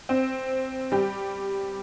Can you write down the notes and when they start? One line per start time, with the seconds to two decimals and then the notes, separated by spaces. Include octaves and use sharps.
0.09 C4
0.92 G3 G4